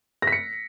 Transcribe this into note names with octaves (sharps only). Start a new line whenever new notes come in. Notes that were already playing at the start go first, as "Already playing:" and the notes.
A#6 B6 C#7